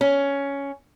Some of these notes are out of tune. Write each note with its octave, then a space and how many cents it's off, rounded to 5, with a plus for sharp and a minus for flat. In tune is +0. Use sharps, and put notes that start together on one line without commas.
C#4 +10